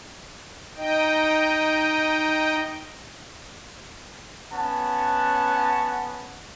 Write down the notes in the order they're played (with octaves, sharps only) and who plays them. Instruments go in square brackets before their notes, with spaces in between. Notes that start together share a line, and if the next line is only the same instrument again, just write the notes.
[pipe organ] D#4 D#5 G5
[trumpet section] B3 C#4 F#5 A5